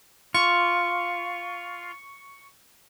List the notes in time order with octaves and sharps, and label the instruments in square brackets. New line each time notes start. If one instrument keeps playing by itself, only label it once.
[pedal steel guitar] F4 [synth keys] C#6